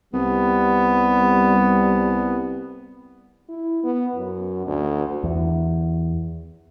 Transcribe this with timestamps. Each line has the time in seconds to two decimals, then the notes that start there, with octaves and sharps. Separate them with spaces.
0.13 C2 G3 B3
3.49 E4
3.83 B3
4.16 F#2
4.67 D2
5.24 E2